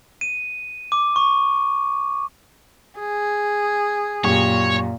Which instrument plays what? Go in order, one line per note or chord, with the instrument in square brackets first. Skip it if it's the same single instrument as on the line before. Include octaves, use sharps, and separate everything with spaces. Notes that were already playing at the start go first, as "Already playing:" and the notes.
[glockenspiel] D#7
D6
C#6
[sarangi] G#4
[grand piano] F#2 G4 C#6 [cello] A#2 [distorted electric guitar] C#5